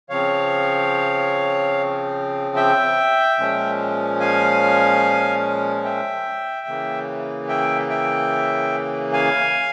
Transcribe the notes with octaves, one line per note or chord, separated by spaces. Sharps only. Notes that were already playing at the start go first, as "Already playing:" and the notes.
C#3 F3 C4 C#5 F5
E5 G5
A#2 F3 G#3 C#4
F5 G#5
E5 G5
C#3 E3 A#3
E5 G5
E5 G5
F5 G#5